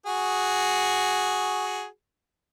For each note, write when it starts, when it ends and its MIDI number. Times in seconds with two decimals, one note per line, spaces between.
0.06 1.86 66
0.06 1.86 68